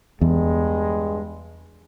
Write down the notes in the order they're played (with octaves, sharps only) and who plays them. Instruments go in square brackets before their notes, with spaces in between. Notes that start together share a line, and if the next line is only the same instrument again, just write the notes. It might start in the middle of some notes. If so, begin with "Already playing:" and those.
[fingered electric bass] E2 [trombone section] G2 G#3